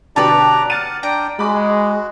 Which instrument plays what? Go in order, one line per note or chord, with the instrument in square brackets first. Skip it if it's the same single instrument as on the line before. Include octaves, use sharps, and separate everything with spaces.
[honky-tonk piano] B2 D3 G4 [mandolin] B4 C#5 A5 [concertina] D5 A#5
[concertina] F#5 [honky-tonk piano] F6 A6 D#7
[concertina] D4 G5 [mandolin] A#5
[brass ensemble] G#3 [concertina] F#4 [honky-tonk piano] B5 D6